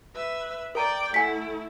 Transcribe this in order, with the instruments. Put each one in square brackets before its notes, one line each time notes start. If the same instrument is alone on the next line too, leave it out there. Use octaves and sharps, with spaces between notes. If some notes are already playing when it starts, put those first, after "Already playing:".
[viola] B4 E5
[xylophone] A#4 A#5 [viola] D5 G5
[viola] A3 E4 [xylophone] F#5 G#5 B6